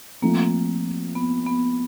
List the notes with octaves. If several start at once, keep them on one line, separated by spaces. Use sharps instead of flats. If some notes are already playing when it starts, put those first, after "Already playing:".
F3 A3 A#3 C4
B3
B3